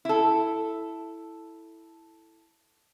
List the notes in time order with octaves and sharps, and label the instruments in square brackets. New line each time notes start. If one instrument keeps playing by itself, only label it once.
[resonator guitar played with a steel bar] E4 A4